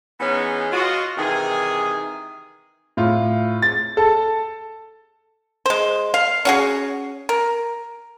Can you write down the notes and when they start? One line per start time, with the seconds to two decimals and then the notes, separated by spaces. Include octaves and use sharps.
0.20 E3 G#3 B3 C#4 D#4
0.72 F4 F#4 D#5
1.17 C3 D#3 E3 G#4
2.97 A2 F4
3.62 A6
3.97 A4 A5
5.66 G#3 C5
6.14 F5
6.45 C#4 F#4 G#4
7.29 A#4